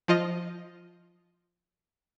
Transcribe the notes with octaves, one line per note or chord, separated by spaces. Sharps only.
F3 F4 D#5